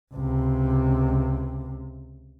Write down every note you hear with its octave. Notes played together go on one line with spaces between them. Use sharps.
C#2 C3